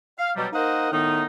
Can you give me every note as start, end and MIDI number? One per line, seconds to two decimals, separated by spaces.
0.18 0.30 77
0.36 0.47 47
0.36 0.47 54
0.36 0.47 55
0.53 0.90 58
0.53 0.90 63
0.53 0.90 70
0.53 0.90 72
0.53 0.90 75
0.53 0.90 78
0.92 1.23 45
0.92 1.23 51
0.92 1.23 59
0.92 1.23 63